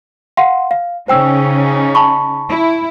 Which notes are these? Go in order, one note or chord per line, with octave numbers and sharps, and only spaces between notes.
F5 F#5 C6
F5
C#3 C#4 D#4 C5 G5 E6
A5 B5 C#6
E4